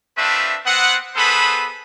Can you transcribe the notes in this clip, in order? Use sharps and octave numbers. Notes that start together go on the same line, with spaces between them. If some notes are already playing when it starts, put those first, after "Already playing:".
A3 C4 D4 F4 B4 E5
B3 C4 F#5
B3 G#4 A4 B4 C5 B5